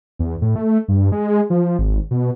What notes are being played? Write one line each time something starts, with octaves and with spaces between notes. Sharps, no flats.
E2
A2
A3
G2
G#3
F3
G#1
B2